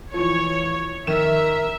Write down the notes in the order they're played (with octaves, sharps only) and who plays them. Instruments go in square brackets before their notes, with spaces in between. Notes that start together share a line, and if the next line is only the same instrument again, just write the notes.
[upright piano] E3 F3 [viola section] C#5
[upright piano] D#3 E7 [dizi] A#4 [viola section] E5